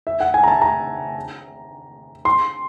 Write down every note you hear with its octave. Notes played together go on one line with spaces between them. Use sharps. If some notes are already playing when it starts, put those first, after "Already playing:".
E5
F#5
G#5
A#5
A5
A#5
C6